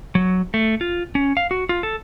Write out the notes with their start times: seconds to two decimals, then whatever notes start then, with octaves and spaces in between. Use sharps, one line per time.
0.15 F#3
0.54 A3
0.81 F4
1.15 C#4
1.37 F5
1.51 F#4
1.69 F4
1.83 A4